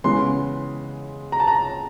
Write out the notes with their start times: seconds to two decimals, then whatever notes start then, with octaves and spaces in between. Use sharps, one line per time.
0.04 C#3 E3 G#3 B3 C6
1.32 A#5
1.40 A5
1.48 A#5